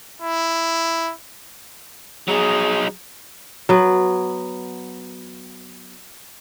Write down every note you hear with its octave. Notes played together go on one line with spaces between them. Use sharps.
E4
F#3 D#4 G#4
F#3 B3